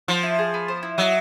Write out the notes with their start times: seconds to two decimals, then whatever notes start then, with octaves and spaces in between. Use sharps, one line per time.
0.08 F3 C5
0.23 E4
0.39 G#4
0.54 B3
0.68 C5
0.83 E4
0.98 F#3 D#5